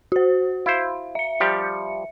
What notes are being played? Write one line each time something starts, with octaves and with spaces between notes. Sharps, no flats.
F#4 C5
E4 C5 F5
E5 C#7
F3 G3 G4